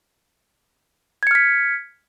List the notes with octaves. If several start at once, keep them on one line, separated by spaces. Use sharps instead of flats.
F6 G#6 B6 C#7